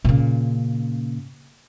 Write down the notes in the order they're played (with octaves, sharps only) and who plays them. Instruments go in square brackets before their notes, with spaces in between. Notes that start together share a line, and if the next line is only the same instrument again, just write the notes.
[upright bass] A#2 C#3